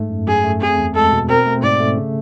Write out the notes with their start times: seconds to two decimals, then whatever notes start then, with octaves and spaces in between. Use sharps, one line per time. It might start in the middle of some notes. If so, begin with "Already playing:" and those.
Already playing: G#2 A3
0.10 F#2
0.27 F#2 G#4
0.44 A3
0.61 C4 G#4
0.78 E2
0.95 G#3 A4
1.12 B2
1.29 C4 A#4
1.46 A3
1.63 G#2 D5
1.80 A3
1.97 C#3